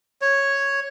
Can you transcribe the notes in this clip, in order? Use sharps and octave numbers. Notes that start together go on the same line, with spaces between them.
C#5